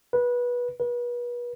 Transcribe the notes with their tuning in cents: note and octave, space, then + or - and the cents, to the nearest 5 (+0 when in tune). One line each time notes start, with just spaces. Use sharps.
B4 -20
B4 -35